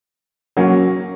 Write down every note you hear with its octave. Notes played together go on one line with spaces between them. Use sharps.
F#3 A#3 C#4